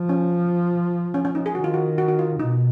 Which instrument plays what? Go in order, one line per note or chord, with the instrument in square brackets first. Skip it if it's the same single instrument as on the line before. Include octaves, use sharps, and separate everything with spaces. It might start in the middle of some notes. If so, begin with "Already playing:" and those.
Already playing: [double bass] F3
[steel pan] C#4
C#4
C#4
D#4
G#4
[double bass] D#3 [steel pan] F#4
[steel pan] F4
F#4
F#4
F#4
F4
[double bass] B2 [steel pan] D#4